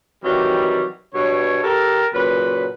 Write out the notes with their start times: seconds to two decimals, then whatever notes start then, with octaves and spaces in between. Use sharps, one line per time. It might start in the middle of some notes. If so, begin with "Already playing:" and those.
0.24 C3 D#3 E3 F#3 G3
1.15 G2 B2 C#5
1.63 G4 A4 A#4
2.14 A#2 C#3 F#3 B4